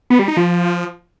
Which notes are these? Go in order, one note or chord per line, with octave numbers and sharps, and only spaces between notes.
B3
G3
D#4
F3